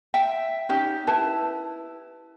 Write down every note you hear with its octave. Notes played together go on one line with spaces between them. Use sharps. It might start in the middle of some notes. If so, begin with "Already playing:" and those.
E5 G5
C#4 D#4 G4
E4 B4 A5